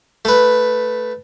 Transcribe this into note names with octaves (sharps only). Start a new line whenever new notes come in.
A3 B4